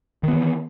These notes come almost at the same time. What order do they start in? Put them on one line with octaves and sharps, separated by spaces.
D#3 B3 E3